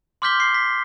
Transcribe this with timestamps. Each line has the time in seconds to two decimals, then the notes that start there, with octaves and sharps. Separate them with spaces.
0.22 C6 D6 F6 G6 B6 G7
0.40 C7
0.54 B6